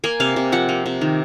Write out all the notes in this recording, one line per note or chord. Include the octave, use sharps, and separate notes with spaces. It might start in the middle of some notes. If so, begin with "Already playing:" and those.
A#3 G#5
C3 F5
C3
F3 F#5
A#3
C3
D#3